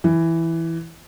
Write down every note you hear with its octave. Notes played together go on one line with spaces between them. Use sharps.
E3